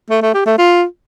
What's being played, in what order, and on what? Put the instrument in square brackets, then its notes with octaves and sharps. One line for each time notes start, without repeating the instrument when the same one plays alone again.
[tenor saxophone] A3
A3
G4
A3
F4